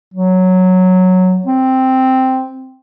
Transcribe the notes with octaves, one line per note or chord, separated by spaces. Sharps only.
F#3
C4